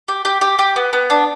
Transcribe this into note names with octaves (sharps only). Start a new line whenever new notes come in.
G4
G4
G4
G4
B3
B3
D4